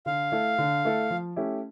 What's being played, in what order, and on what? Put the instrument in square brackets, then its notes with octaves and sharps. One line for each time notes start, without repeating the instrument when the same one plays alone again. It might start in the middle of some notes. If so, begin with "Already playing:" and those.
[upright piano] D3 [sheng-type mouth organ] F5
[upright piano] A3 E4 A4
D3
A3 E4 A4
F3
A3 C#4 E4 G4